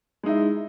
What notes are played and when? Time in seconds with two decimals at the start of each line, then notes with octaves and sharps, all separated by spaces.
0.23 G#3
0.26 D#4
0.29 E4